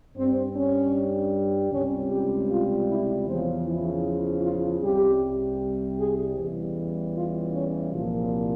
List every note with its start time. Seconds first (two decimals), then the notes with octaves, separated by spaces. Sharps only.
0.17 G2 G3 C4
0.56 C#4
1.72 C#2 C3 G3 C#4
2.10 G4
2.50 F4
2.88 E4
3.27 E2 C#3 F3 C4
3.65 E4
4.43 F4
4.82 C2 C3 G3 G4
5.98 G#4
6.37 E2 C#3 E3 G3
7.15 F4
7.54 C#4
7.92 C2 A#2 F3 F4